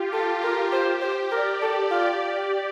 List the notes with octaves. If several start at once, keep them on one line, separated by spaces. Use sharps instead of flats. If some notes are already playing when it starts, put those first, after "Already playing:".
Already playing: F4 G4
F4 A4
A#4
G4 C5
C5
A#4 D5
A4
F4